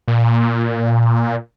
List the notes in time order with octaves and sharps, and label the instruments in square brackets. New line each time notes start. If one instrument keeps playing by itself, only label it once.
[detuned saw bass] A#2